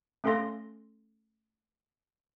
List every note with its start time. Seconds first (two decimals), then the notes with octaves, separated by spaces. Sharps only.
0.24 A3 C#4 A4 F5 C6 A#6